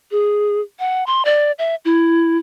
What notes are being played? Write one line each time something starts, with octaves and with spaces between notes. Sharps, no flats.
G#4
F#5
C6
D5
E5
E4